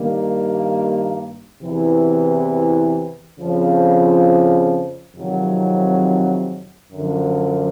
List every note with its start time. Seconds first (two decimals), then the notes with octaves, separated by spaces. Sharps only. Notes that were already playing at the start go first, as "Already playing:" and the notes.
Already playing: G2 D#3 G3 A#3
1.62 E2 C3 E3
3.39 F2 C#3 F3
5.15 F2 C3 D#3 F#3
6.91 F#2 D3 F3